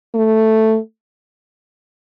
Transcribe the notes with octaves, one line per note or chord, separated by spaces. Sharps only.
A3